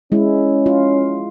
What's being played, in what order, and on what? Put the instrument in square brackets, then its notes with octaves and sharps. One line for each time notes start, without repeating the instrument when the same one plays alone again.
[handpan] G#3 E4 [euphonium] C#4
[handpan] F4